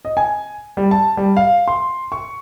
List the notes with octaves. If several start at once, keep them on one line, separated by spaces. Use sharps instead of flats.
D#5
G#5
G3
A5
G3
F5
C6
C#6